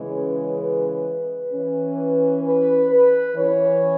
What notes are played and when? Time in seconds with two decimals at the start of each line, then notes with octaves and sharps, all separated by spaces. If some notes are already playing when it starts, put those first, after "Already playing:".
Already playing: C#3 E3 G#3 C#4
0.14 B4
0.60 B4
1.52 E3 C#4
2.44 B4
2.91 B4
3.36 E3 C#4 C#5